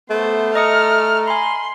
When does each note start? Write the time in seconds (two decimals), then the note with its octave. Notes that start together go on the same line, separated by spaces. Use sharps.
0.10 A3 B3 C5
0.55 D#5 A#5 D#6 F6 C#7
1.28 G#5 B5 C6